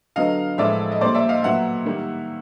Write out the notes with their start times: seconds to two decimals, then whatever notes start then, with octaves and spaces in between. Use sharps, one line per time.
0.16 D3 F#3 B3 D#5 F5
0.58 A2 F3 G#3 B3 D5 E5
0.92 D#5
1.01 A#2 G3 A#3 C5 D5
1.15 D5 E5
1.29 D#5 F5
1.43 A#2 F#3 B3 E5 F#5
1.85 D#3 G3 A#3